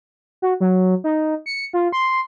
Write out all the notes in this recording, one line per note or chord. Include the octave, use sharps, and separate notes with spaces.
F#4
F#3
D#4
C#7
F4
C6